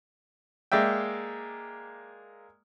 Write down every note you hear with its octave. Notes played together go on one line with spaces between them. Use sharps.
G#3 A#3 D5 E5 G5